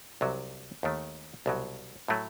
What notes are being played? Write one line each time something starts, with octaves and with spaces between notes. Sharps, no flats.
C2 C3 F#3
D#2 D#3 A3
C2 B2 F#3
A2 F#3 A3